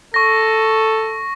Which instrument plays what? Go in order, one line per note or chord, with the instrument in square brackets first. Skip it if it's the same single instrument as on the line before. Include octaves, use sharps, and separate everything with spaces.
[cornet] A4 [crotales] C#6 A#6